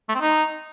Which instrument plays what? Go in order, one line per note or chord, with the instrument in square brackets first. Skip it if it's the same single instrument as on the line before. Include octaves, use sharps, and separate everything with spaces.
[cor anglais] A3
C4
D#4